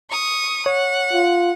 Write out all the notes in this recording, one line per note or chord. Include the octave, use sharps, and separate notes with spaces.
C#6 D#6
C#5 F#5
F4